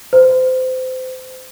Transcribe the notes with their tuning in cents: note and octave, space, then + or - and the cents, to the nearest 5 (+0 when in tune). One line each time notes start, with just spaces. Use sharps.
C5 -25